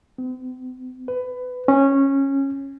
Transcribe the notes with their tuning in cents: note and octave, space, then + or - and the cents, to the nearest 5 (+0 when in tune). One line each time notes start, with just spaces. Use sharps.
C4 -45
B4 +20
C#4 -15